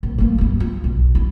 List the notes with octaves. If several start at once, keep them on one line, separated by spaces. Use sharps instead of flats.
A#1
A3 A#3
G2 E4
F4
B1
E4